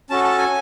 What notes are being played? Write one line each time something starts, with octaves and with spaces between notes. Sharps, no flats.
C#4 F#4 A4 A5
A5
G#5